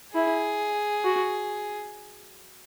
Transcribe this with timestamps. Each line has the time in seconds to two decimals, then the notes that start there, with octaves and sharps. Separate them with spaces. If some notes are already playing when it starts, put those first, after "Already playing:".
0.15 E4 G#4
1.04 F#4